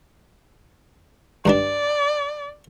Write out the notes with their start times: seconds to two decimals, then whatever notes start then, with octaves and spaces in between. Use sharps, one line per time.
1.46 G2 G3 D4 D5